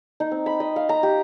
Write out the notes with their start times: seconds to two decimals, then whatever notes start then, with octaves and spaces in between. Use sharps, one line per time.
0.20 D#4
0.31 C4
0.46 B5
0.60 D#5
0.76 F5
0.89 A#5
1.03 G4